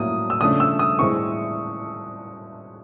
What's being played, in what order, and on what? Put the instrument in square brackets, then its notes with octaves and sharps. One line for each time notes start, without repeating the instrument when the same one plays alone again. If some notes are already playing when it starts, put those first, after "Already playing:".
Already playing: [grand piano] A2 F#3 A#3 [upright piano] D#6
[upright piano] E6
[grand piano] C#3 F3 A3 D4 [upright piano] D#6
[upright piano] E6
D#6
[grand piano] A2 E3 G#3 C4 E4 [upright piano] C#6